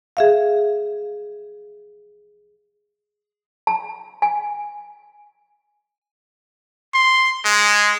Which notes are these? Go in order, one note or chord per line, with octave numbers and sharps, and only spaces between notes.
G#4 E5 F5
A5
G#5
C6
G#3